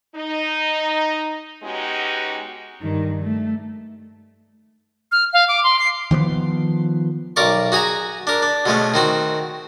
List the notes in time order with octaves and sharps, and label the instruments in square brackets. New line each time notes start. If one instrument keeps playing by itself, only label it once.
[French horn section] D#4
G#3 B3 C#4 D#4 F#4 G4
[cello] G2 D#3
A3
[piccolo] F6
F5
D6
C6
C7
[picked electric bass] D#3 F3 G#3 B3
[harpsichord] B1 A#4 D5 C#6
F#4 G#4 G#5 A#5
D4 A#4
D4
B2 G#3 A3 C#4
D#3 C4 F#4